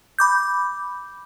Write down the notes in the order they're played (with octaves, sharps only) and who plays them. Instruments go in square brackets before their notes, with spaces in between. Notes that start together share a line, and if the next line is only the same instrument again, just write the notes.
[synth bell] B5 D6 G6